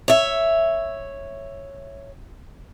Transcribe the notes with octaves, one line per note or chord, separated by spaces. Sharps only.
C#5 E5